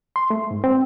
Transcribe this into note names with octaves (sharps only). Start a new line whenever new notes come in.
C6
A3
G#2
C4